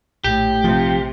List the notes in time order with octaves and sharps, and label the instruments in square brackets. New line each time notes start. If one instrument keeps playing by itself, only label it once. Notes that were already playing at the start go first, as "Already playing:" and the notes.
[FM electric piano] A#1 [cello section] A2 [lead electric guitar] G4
[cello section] C3 [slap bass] F3